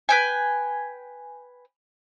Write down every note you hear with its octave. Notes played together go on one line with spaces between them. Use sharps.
B4 G5 G#5